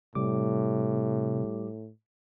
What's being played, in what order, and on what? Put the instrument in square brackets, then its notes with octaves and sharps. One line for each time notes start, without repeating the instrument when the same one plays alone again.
[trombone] A2 [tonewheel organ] C3 [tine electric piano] G3 G4 D6